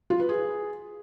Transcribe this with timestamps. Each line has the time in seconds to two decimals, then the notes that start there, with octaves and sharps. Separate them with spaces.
0.10 F4
0.20 B4
0.29 G#4